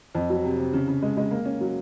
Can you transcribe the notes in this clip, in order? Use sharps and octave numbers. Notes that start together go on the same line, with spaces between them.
F2
F#3
C3
C3
C#3
C#3
G#3
G#3
A#3
C#4
F#3